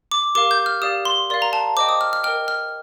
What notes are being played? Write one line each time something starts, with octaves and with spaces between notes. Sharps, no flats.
D6
G4 A#4 F5 D6
G6
F6
G4 D5 F5 D#6
C6
A#4 D5 F5 C6
A#5
A5
C5 D#5 G5 D6
D#6
F6
F6
A#4 D#5 G5 F6
F6